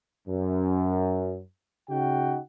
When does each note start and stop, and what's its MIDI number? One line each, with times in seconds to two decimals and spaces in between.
0.28 1.40 42
1.89 2.39 49
1.89 2.39 63
1.89 2.39 66
1.89 2.39 78
1.89 2.39 79